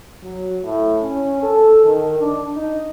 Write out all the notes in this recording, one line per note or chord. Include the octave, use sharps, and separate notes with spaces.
F#3
A2
C#4
A4
D#3
D4
D#4